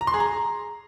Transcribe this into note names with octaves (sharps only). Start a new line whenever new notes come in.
A#5
C6
G#4
A#5